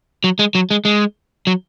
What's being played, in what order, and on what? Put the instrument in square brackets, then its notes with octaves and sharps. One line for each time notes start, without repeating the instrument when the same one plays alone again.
[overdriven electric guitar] F#3
G#3
F#3
G#3
G#3
F#3